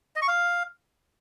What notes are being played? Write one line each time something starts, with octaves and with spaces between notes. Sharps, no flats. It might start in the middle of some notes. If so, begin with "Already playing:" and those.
D#5
C#6
F5